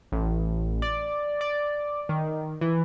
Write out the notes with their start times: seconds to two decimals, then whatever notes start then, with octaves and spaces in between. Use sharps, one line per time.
0.12 A1
0.82 D5
1.41 D5
2.09 D#3
2.61 E3